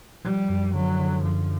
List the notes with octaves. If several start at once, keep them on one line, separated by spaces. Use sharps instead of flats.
F3 G3
F#2
D3 F#3
D3
F#2 F3